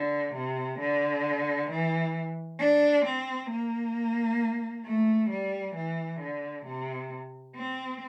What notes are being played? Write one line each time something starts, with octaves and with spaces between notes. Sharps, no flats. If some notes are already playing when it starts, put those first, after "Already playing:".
Already playing: D3
C3
D3
E3
D4
C4
A#3
A3
G3
E3
D3
C3
C4